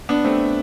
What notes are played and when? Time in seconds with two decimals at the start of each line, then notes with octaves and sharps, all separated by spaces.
0.09 B3 D4
0.25 A3 C4